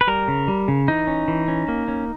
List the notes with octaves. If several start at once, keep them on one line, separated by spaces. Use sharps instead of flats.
B4
G3 A#4
C#3
G3
C#3
E3 D#4
C#4
E3
C#4
A#3
C#4